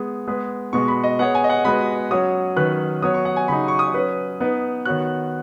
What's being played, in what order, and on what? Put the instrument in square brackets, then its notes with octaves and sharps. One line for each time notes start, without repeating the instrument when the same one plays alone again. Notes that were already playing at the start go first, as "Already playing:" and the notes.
Already playing: [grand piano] G#3 B3 G#4
G#3 B3 G#4 B4
[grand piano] B2 G#3 B3 F#4 [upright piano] C#6
[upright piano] B5
D#5
[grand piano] B3 G#4 C#5 [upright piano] F#5
[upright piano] G#5
D#5
F#5
[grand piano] G#3 B3 F#4 B4 [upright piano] B5
[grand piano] F#3 C#4 F#4 C#5 [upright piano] D#6
[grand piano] D#3 F#3 C#4 B4 [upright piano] F#6
[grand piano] F#3 B3 F#4 C#5 [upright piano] D#6
[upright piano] C#6
F#5
G#5
[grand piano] C#3 F#3 D#4 [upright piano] B5
[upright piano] C#6
D#6
[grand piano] F#3 C#4 B4
B3 D#4 B4
[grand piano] D#3 B3 F#4 C#5 [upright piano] F#6